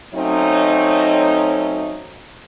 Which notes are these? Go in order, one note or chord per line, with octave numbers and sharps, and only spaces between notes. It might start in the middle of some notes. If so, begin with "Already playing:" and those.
F#3 A3 C4 C#4 D#4